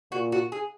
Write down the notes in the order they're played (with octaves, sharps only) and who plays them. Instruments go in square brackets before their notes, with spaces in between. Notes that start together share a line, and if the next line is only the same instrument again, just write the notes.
[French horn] A#2 [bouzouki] F#4
[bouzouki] F#4
G#4